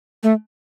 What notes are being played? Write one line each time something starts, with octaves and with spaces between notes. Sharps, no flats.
A3